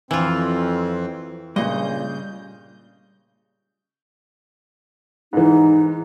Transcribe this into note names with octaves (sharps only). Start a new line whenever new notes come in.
F2 E3 C4 F4
G2 A#2 C#3 D#5 G6
G#2 E3 D#4